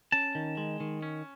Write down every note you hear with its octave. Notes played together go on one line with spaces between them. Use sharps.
C#4 A5
D#3
G#3
D#3
C#4